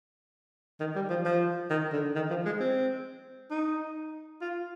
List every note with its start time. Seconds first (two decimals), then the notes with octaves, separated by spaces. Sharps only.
0.80 D#3
0.96 G3
1.09 F3
1.25 F3
1.70 D#3
1.92 D3
2.16 D#3
2.30 F3
2.45 G#3
2.60 C4
3.51 D#4
4.41 F4